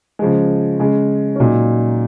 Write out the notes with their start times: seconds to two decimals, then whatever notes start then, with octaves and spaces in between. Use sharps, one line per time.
0.19 C#3 F3 G#3
0.79 C#3 G#3
1.36 C#4
1.40 A#2 F#3 D#4